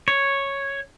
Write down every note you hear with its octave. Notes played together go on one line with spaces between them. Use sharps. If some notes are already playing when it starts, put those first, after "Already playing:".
C#5